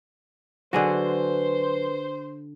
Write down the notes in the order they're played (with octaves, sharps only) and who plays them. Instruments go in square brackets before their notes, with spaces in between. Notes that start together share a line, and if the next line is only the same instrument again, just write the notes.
[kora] D3 F#4 [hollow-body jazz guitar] F#3 G#4 [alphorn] B4 [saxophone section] C5